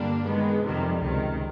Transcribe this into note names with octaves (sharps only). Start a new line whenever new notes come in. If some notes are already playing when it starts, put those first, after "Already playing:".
Already playing: G2 D3 G3 A#3 D4
D#3 G#3 B3
F2 C3 D#3 G3
C#2 C3 D#3